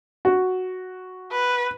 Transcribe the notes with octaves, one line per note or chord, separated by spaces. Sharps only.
F#4
B4